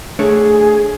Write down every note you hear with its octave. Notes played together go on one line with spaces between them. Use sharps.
A3 D4 G#4 C#5